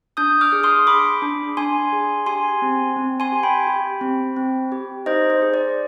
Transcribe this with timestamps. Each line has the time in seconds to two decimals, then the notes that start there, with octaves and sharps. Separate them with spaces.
0.17 D4 D#6 G6
0.41 D6 F6
0.52 G#4
0.63 C6 D#6
0.87 G#4 B5 D6
1.22 D4
1.57 D4 G#5 C6
1.93 G#4
2.26 G4 G#5 C6
2.62 C4
2.97 C4
3.20 G#5 C6
3.32 G4
3.43 G5 B5
3.67 G4
4.01 C4
4.36 C4
4.72 G4
5.06 D#4 C5 D#5
5.30 C5
5.42 G#4
5.54 D5